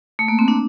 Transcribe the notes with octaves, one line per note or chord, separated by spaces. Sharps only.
A3
A#3
C4
D4